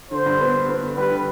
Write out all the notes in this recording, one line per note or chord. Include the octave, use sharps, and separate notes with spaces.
D3 C5
G2
B3
B3
B3
D3
G3 B4
D3